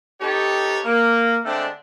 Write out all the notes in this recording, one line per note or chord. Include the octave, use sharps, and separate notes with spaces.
C4 D#4 G4 A4 B4 C#5
A#3
D3 G#3 A3 C4 D4